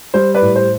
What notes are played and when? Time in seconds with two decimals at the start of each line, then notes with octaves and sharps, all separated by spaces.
0.14 G3 C5
0.34 B4 D5
0.42 A2
0.55 C5